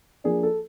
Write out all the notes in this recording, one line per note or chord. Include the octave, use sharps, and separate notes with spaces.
F3 A#3 D4 G#4
A4